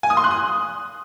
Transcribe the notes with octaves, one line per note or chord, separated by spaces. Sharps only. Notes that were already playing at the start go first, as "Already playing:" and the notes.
G#5
D#6
C6
F#6
D#6